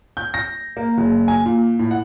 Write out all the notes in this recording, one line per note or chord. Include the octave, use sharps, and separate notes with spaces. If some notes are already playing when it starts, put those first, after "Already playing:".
G6
A#6
A#3
F#1
G#5
A#2
A2
F#5